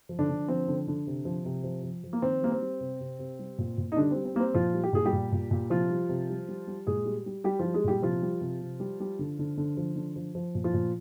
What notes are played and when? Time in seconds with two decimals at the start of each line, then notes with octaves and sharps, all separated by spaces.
0.09 F3
0.19 D3 D4
0.29 D3
0.48 F3 C4
0.68 D3
0.88 D3
1.07 C3
1.25 F3
1.45 C3
1.64 F3
1.83 F3
2.04 F3
2.13 A#3
2.22 D#3 C4
2.42 G3 A#3
2.52 C4
2.62 G3
2.80 C3
3.00 C3
3.19 C3
3.39 G3
3.58 A#2
3.78 A#2
3.92 D#4
3.96 D3 G3 D4
4.11 G3 C4
4.25 C4
4.35 G3 A#3
4.40 C4
4.54 A#2 F3 F4
4.74 G3
4.84 G4
4.93 A#2 G#4
5.05 G3 G4
5.13 A#2
5.32 A#2
5.51 A#2
5.70 C3 F3 F4
5.90 G3
6.09 C3
6.29 G3
6.48 G3
6.67 G3
6.87 A#2 G#3 G#4
7.06 G3
7.26 G3
7.44 G3 G4
7.59 F3 G3 F4
7.74 G#3 G#4
7.84 A#2 G3 G4
8.02 C3 F3 F4
8.22 G3
8.41 C3
8.61 C3
8.80 G3
9.00 G3
9.19 D3
9.39 D3
9.57 D3
9.77 F3
9.96 D3
10.16 F3
10.35 F3
10.55 A#2
10.64 F3 F4
10.74 A#2